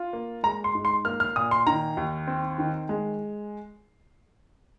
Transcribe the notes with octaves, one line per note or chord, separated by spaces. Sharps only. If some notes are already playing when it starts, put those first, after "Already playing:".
Already playing: F4
A#3
G#3 A#5
C6
G#2
C6
A#3 F6
F6
A#2 D#6
C6
D#3 A#5
D#2
C4
D#3
G#3